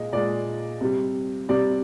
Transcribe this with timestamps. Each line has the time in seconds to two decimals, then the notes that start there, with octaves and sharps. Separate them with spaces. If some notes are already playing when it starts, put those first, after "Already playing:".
Already playing: A#2 G#3 D#5
0.12 A#2 G#3 D5
0.81 C3 G3
1.49 C3 G3 D5